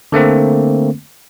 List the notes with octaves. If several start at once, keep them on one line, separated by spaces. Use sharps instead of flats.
D3 A3 A#3 C4